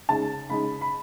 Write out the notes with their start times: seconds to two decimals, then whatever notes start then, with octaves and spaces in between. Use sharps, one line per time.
0.09 C#3 G#3 D#4 A5
0.49 C#3 G#3 D#4 B5
0.81 B5